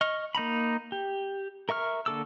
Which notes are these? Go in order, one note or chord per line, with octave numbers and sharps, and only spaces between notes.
D#5 C#6 F6
A#3 D#4 A#5 B5
G4
A#4 E5 C#6 F6
D3 A#3 A4 D6 E6